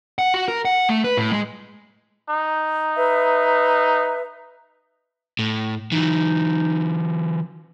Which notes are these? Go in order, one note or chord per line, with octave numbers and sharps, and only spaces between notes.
F#5
F#4
A#4
F#5
A3
B4
A2
G#3
D#4
B4 E5
A2
E3 F#3 D#4